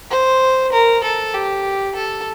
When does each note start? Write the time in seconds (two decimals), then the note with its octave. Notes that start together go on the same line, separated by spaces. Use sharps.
0.11 C5
0.72 A#4
1.04 A4
1.34 G4
1.96 A4